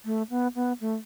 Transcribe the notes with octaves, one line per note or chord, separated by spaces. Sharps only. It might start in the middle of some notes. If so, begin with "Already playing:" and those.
A3
B3
B3
A3